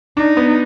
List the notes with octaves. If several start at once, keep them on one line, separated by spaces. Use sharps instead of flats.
D4 D#4
B3